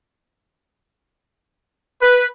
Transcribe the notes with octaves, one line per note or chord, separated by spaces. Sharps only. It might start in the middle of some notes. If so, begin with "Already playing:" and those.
B4